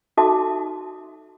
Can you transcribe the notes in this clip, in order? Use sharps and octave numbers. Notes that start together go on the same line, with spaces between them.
D#4 F#4 A4 E5 A5 D6